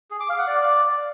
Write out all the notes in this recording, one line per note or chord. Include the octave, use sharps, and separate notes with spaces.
G#4
D6
F5
F#5
D5